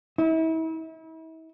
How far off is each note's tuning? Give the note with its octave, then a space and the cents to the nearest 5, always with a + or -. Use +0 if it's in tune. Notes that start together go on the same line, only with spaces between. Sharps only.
E4 -40